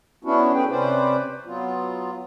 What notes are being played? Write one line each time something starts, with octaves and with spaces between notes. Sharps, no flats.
B3 C#4 D4 E4 F#4
A3 G#4 B4 G5
C3 C#4 B4 C5 D5
F#3 B3 F4